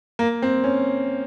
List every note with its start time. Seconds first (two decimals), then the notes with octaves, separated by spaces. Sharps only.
0.19 A#3
0.42 C4
0.64 C#4